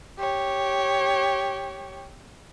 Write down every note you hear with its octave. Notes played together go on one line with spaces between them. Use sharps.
G4 C#5